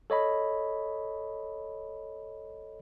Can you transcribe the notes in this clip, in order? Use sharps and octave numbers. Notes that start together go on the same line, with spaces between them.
A4 C#5 D#5 B5